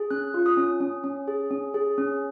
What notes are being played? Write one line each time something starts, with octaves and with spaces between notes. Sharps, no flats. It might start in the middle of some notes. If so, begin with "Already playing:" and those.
Already playing: G#4
C#4 F#6
F4
D#6
C#4
C#4
C#4
G#4
C#4
G#4
C#4